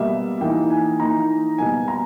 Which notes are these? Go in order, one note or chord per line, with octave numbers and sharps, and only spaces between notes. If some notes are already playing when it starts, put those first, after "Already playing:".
Already playing: B2 G3 A#3 E5
E3 A#3 D#4 G5
G#5
E3 A#3 D#4 A#5
B2 G3 A#3 G#5
A#5